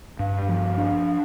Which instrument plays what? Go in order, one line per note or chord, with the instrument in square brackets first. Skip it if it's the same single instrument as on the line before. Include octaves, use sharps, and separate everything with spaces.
[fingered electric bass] G2 [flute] F5
[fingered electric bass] F3
D4